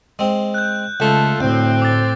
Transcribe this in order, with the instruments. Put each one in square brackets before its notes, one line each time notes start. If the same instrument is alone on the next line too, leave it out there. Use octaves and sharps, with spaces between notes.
[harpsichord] G#3 C4
[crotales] F#6 G6
[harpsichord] C#2 [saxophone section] A3 F4 A4
[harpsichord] D2 [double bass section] A2 [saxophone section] C4
[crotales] D6 A6